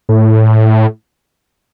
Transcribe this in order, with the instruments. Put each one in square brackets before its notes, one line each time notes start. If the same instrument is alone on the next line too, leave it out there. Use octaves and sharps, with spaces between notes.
[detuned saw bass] A2